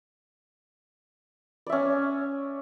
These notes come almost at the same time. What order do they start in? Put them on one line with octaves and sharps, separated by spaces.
D5 E5 C#4